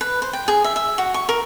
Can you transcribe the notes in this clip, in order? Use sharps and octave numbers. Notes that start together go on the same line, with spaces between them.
B4
C5
G5
G#4
E5
E5
F#4
C#6
A#4